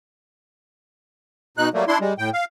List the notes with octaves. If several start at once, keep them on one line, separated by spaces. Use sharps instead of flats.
B2 D#4 F#6
F#3 G3 A3 A#3
D4 E4 C6
G3 G#3
A2 G5
F5